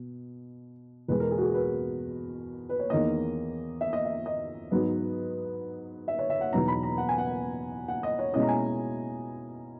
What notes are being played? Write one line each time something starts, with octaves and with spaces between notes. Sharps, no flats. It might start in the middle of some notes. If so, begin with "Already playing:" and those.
Already playing: B2
E2 B2 G#3 B4
A#4
G#4
F#4
G#4
B4
B4
C#5
E2 D#3 A#3 D#5
E5
D#5
E5
D#5
G#2 F#3 B3
E5
C#5
E5
F#5
E2 B2 F#3 B3 D#4 A#5
B5
A#5
F#5
G#5
F#5
F#5
D#5
C#5
B2 G#3 C#4 E4 D#5
A#5
G#5